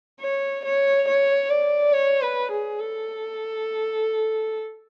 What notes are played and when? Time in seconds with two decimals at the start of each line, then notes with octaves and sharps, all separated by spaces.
0.21 C#5
0.65 C#5
1.08 C#5
1.50 D5
1.93 C#5
2.22 B4
2.51 G#4
2.80 A4